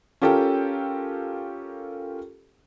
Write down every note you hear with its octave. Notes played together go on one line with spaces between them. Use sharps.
C#4 F4 G4 A4 A#4 G5